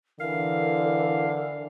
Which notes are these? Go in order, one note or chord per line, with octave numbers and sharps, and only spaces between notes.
D3 E3 A#4 F5